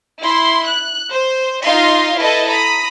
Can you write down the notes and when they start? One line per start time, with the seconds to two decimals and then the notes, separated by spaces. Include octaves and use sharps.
0.21 E4 C6
0.67 F#6
1.10 C5
1.64 D#4 F4 D#5 F5 C6
2.17 E4 A4 B4 D#5
2.49 A#5 B5 D#6